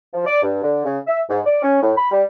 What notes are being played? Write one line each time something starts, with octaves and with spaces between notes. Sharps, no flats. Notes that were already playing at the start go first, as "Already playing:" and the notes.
F3
D5
G2
D3
C#3
E5
G#2
D5
C#4
A2
B5
G3